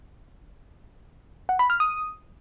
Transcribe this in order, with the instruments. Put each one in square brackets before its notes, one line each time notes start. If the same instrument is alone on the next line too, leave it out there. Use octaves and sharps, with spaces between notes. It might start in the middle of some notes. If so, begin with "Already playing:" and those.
[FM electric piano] F#5
B5
F6
D#6